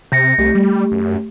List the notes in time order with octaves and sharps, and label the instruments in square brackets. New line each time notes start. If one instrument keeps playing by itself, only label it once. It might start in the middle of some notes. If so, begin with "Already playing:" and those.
[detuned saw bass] C3 [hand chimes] G6 A#6 C#7
[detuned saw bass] C2 [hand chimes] A3 G4
[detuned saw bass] G3
F#2